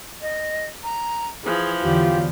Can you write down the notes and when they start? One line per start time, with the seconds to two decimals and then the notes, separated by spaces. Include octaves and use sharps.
0.22 D#5
0.84 A#5
1.44 E3 F3 G#4
1.82 E2 D3 F#3 G3 F4 G4